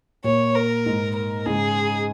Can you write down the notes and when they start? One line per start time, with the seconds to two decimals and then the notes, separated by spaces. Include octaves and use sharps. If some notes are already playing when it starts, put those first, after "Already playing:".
0.24 A#2 C#5
0.55 A#4
0.86 G#2
1.15 A#4
1.46 G#2 C#3 G#4